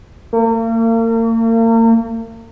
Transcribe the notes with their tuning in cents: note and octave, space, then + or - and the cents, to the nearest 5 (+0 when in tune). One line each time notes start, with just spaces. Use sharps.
A#3 -40